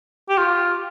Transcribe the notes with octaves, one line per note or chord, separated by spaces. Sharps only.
G4
F4